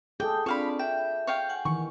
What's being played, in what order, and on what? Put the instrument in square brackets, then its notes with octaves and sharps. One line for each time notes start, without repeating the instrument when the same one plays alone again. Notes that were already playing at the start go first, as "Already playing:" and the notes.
[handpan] G#4 A4 [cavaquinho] G5 [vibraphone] D6 D#6
[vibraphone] C4 D4 D5 [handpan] F4 [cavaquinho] C#5 F5 B5
[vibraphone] E5 [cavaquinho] G5
[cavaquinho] C#5 F5 G5
[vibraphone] F#5 G#5
[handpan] D#3 E3 [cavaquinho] C#6